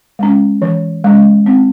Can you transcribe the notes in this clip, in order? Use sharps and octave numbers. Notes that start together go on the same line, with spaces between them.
G#3 C#4
E3
G#3 C#4
C4